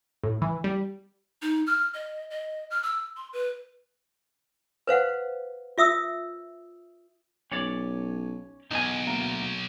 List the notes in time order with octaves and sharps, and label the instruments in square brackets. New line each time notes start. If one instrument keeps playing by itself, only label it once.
[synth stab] A2
E3
G3
[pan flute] D#4
F6
D#5
D#5
F6
E6
C6
B4
[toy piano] B4 C5 F5 F#5
F4 E5 D#6 E6
[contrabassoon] B1 [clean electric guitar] C#4 C#5 D5
[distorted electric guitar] B1 [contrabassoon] E2 [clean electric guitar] D#4 G#5
[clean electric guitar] D2 A#3